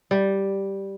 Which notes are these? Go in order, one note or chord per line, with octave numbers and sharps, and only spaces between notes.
G3